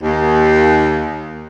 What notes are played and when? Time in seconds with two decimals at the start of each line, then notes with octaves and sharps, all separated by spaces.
0.01 D#2